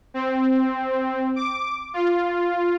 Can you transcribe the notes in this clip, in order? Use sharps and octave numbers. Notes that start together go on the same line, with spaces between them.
C4
D6
F4